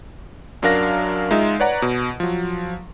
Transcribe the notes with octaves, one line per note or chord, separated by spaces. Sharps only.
F#2 F#3 D4 A#4 F5 A#6
G#3 D#4 F4 E5
B4 C#5 D5 F#5 A#5
B2
F3 F#3